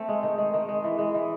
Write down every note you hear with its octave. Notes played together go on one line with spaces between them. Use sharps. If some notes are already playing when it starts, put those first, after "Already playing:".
Already playing: A3 C4
G#3
D#3
G#3
D#3
G#3
E3
G#3
E3